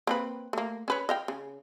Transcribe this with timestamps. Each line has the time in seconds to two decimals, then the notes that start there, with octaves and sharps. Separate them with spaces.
0.07 A#3 C4 B4
0.53 A3 A#3
0.88 C#4 B4 C#5
1.09 D#5 F5 G5
1.28 C#3